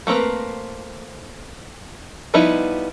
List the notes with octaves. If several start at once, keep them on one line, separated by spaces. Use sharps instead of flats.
A3 A#3 C4 A#4 B4
F3 G3 B3 D#4 E4